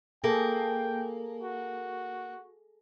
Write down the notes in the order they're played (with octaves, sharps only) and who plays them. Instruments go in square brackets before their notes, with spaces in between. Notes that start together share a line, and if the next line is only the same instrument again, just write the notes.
[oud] A#3 [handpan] G#4 A4 [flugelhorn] G5
[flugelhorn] F#4